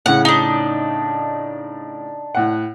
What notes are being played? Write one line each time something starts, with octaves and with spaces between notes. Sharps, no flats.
A2 C#3 F#5
D4 D#4
A2 F#5